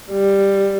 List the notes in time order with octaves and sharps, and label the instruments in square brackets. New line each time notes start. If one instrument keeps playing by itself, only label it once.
[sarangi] G3